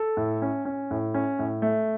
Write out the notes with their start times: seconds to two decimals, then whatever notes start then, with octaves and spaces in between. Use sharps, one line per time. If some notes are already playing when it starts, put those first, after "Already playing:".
Already playing: A4
0.17 A2
0.42 C#4
0.65 C#4
0.91 A2
1.14 C#4
1.39 A2
1.62 A3